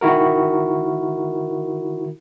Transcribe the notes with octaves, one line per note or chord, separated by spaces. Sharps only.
D#3 E4 F#4 A#4